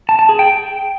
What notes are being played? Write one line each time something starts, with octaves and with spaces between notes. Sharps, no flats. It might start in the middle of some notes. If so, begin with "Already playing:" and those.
A5
A5
G#4
G5